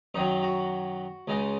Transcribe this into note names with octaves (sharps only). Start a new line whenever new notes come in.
F#2 D#3 F#3 D#4
F#4
C#2 C#3 G#3 D#4